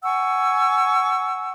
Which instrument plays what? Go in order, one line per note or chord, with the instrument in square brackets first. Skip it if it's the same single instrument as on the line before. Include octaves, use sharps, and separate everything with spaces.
[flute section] F#5 G#5 C#6 E6